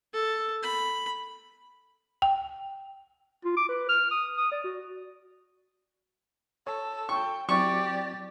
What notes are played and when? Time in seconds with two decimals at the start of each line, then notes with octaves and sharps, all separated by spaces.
0.13 A4
0.63 B5
2.22 G5
3.45 F4
3.57 D6
3.69 B4
3.89 F6
4.11 D#6
4.37 D#6
4.52 D5
4.64 F#4
6.67 A4 C#5
7.09 G5 C#6
7.49 F#3 C4 E4 G4 D5 C#6